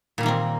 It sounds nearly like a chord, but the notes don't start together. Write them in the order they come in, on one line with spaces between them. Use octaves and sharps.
A#2 G3 D#3 A#3 C4